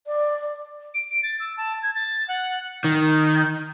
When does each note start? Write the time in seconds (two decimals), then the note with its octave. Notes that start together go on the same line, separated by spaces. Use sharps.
0.07 D5
0.94 D7
1.23 A6
1.40 E6
1.57 A5
1.82 G#6
1.95 A6
2.28 F#5
2.84 D#3